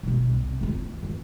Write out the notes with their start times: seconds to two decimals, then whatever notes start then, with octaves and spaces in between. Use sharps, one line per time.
0.03 B2 B3
0.30 C2
0.61 E3 F4
1.03 E3